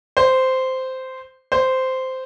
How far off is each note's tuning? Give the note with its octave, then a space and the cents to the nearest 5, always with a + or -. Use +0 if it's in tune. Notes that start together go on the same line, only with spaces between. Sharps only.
C5 -10
C5 -10